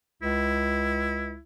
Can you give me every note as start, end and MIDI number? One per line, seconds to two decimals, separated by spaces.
0.22 1.39 37
0.22 1.42 64